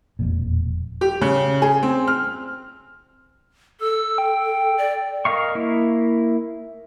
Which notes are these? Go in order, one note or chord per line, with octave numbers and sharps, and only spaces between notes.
E1 F2 A#2
G4
C#3
G#4
C4
F6
A4 E6
G5
D5
A#4 D#5 F5 C#6
A#3 E4